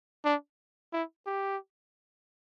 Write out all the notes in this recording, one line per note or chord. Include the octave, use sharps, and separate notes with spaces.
D4
E4
G4